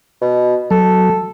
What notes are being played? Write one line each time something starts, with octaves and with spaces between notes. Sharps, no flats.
B2
F#3 A4